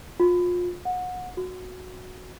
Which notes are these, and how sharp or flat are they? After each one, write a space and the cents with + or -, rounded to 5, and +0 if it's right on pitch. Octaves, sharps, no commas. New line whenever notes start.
F4 +30
F#5 -25
F#4 -10